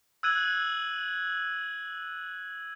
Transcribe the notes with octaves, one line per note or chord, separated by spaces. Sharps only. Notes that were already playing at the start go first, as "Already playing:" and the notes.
E6 F#6 G#6 D#7 F#7